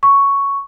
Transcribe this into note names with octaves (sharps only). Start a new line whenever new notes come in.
C#6